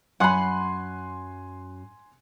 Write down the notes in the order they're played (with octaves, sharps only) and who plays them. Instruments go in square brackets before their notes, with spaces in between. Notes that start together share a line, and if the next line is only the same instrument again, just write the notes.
[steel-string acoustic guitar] F#2 [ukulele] F#5 B5 [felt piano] G#5 C6 F#6